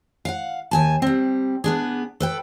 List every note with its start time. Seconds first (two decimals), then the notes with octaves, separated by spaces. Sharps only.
0.25 F5 F#5
0.71 D#2 G#5 A5
1.02 G3 C4
1.64 B3 D4 G#4
2.20 A4 B4 G5